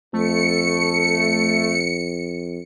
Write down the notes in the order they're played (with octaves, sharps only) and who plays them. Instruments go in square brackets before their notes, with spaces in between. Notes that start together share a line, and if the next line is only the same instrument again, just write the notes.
[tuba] F2 [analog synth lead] A3 [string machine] C#7